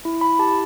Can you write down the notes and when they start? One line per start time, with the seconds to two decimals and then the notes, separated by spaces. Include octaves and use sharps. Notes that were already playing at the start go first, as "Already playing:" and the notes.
0.05 E4
0.21 B5
0.39 G4 A5